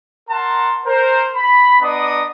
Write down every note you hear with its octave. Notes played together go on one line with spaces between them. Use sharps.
A#4 F#5 A5 A#5 C6
A#4 C5
B5
B3 D4 D5 D#5 A#5 D#6